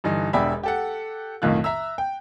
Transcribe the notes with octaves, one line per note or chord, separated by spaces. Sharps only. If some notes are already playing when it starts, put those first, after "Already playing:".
G2 D3 E3 D#4
E1 E2 D4 G4 E5 B5
G4 A4 F#5
B1 F2 A2 D#3 F4 F#6
E5 A#5 E6
G5